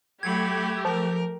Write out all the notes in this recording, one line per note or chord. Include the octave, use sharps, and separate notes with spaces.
F#3 A3 G4 B5 G#6
F3 A#4